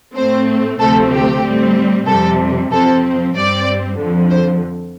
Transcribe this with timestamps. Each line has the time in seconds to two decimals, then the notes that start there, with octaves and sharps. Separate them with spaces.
0.15 A2 A3 C4 C5
0.80 D2 C3 F3 A3 C4 A4
1.11 G4
1.43 A2 G3 C4
2.06 F2 C3 G3 A4
2.70 F2 F3 C4 A4
3.35 G2 G3 C4 D5
3.98 F2 D3 F3
4.30 C5